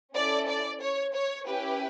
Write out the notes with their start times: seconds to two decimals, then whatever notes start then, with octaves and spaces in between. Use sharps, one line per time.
0.16 C#4 E4 A4 D5
0.49 D5
0.82 C#5
1.14 C#5
1.48 C#4 E4 G4 B4